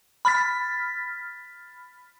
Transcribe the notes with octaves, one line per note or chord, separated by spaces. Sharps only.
B5 F6 A6 B6